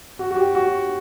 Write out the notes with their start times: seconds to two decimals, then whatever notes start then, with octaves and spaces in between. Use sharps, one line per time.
0.19 F#4
0.31 F#4
0.36 G4
0.55 F#4